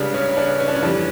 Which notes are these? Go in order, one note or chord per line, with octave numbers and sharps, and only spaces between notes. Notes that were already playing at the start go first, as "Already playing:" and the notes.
Already playing: C#2 C#3 G3 D4
C#4
D4
C#4
D4
C#4
F2 E3 G3 D4